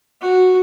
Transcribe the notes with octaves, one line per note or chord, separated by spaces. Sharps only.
F#4